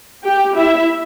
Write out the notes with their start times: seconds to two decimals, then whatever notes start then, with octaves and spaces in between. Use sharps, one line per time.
0.25 G4 G5
0.57 E4 E5